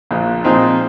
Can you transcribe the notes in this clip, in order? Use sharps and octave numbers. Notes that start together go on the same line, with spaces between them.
A#1 A#2 F3 A#3
A#2 F3 C4 D#4 G#4